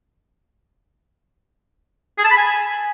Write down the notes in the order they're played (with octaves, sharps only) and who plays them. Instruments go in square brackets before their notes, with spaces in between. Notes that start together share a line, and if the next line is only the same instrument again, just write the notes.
[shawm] G#4
A5
B5
G#5